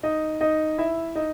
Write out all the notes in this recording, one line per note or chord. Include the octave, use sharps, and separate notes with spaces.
D#4 D#5
D#4 D#5
E4 E5
D#4 D#5